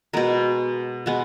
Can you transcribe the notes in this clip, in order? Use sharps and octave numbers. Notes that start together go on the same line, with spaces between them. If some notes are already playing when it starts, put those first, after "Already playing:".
B2 G#3 B3 A#4
B2 G#3 B3